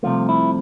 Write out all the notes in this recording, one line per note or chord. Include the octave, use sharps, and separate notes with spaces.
C2 C3 F3 A3 F4
E4